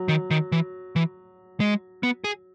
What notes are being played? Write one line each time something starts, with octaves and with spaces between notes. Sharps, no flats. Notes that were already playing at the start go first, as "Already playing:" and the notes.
Already playing: F#3
D#3
D#3
E3
E3
G#3
B3
G#4